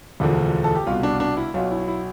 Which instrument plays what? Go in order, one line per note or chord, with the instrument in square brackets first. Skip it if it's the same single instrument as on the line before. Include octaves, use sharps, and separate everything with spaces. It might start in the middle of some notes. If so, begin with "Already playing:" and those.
[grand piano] E1 D2 D3 F3
A4
G4
C2 B2 F4
D4
D4
E4
B1 B2 F4
E4
E4